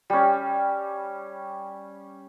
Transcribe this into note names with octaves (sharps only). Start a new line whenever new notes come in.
G3 C#4